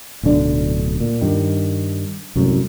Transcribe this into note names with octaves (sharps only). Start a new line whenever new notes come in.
D1 B1 D3 D4
A#2
G2 D#3
C2 F#2 A2